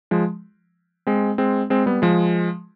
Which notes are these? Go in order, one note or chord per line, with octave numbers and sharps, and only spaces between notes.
F3 G#3
G#3 C4
G#3 C4
G#3 C4
G3 B3
F3 G#3